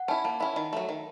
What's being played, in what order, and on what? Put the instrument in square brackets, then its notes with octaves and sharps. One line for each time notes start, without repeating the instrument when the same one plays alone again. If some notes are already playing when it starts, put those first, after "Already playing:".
Already playing: [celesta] F#5
[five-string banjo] C#4 E4 [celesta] A5
[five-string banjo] A#3 [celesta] A5
[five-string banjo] C#4 E4 [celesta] B5
[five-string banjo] D#3
F#3 A3
D#3